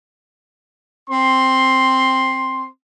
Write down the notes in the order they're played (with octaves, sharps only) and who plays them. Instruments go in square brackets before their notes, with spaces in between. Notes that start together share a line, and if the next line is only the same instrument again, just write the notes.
[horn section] C4 C6